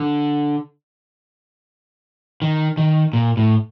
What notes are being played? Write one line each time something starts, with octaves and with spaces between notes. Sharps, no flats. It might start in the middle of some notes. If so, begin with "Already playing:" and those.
Already playing: D3
D#3
D#3
A#2
A2